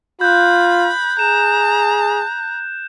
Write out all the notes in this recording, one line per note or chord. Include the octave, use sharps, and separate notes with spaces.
F4 B5 F#6 G6
G#4 A#5 E7